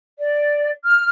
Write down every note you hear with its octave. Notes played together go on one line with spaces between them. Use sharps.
D5
F6